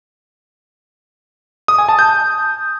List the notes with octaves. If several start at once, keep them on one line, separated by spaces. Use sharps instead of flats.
D#6
G#5
A5
G6